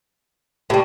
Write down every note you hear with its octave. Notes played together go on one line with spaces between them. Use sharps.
A2 G3 G4